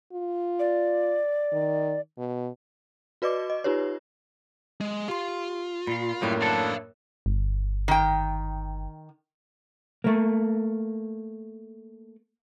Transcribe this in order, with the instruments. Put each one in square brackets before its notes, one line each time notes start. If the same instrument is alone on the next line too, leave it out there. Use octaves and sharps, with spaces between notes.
[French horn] F4
[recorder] D5
[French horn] D#3
B2
[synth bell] F#4 B4 D5 D#5 D6
D#5
D#4 F4 G4 B4 C#5
[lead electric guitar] G#3
[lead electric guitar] F4 [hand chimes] G4 C6
[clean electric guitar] A#2 [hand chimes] B5 C7
[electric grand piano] F#2 A2 A#3 [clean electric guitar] G3 [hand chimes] A#4 C#5 F#6
[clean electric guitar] D4 E4 A4 [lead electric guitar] F5 A5
[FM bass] G1
[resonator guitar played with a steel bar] D#3 G5
[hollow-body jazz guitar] A3 A#3